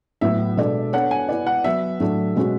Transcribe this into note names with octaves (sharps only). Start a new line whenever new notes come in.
A2 F#3 B3 E5
B2 G#3 D4 A4 D5
B3 D4 A4 C#5 F#5
G#5
B3 E4 B4 D5
F#5
F#3 B3 F#4 B4 E5
A2 F#3 A3 D4
B2 G#3 C#4 F#4